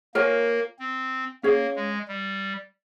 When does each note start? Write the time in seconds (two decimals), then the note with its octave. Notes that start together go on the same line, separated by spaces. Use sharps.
0.15 A#3 F4 A#4 C#5 G#5
0.79 C4
1.43 A#3 C#4 G#4 C#5 F5
1.76 G#3
2.08 G3